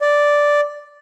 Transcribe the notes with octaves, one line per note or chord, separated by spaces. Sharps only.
D5